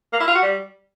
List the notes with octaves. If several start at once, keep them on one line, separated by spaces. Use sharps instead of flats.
A#3
E4
F4
F#4
G3